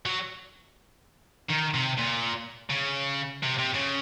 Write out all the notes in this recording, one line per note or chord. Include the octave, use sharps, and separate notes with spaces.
F#3
D#3
C3
A#2
C#3
C3
C3
C#3